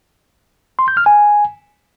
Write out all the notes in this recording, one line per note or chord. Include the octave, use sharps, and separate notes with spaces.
C6
G6
F6
G#5